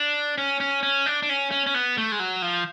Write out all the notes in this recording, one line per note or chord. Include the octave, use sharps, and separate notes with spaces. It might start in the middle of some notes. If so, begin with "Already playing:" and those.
Already playing: D4
C#4
C#4
C#4
D4
D4
C#4
C#4
C#4
B3
A3
G#3
F#3
F3